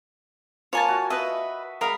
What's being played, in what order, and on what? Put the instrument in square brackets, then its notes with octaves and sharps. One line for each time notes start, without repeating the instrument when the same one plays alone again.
[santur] A#3 F4 [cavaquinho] C#5 G#5 A5
[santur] F#4
[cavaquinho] B4 D#5 [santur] E5 A5 E6
[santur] G#3 B5 [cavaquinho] A#4 F5 D#6